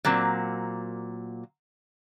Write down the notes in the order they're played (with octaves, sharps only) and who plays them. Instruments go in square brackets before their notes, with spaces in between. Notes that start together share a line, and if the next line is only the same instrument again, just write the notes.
[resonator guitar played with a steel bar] A#2 F#3 A#3 C4